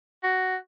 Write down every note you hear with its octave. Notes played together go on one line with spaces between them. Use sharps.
F#4